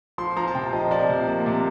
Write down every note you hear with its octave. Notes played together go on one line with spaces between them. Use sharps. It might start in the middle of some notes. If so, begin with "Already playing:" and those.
F3 C6
F3 A#5
A5
C3 G5
F3 D#5
F3 D5
C3
A#3
C3